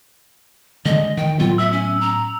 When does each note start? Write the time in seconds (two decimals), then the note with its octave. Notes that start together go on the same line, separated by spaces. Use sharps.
0.85 D3 G#3 D#5
1.17 D#3 G5
1.39 A2 F#3 B3 F4
1.58 E5 E6
1.72 C#4
2.01 A#5